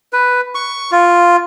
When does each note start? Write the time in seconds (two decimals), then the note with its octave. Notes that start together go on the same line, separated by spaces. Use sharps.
0.13 B4
0.55 C#6
0.92 F4